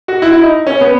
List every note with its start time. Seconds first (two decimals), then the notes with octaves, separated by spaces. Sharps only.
0.08 F#4
0.22 E4
0.32 E4
0.42 D#4
0.67 C#4
0.81 B3